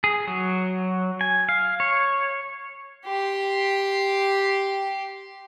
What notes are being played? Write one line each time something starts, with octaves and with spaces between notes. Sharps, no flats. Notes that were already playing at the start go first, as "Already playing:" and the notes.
G#4
F#3
G#5
F5
C#5
G4 C6